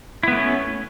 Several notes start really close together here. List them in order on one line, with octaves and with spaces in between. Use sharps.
E4 B3 A3 C#4